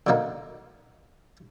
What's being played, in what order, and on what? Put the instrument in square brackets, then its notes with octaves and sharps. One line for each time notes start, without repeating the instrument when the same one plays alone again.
[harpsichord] D3 F#3 A#3 D#4